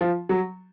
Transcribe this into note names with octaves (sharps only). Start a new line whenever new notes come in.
F3
F#3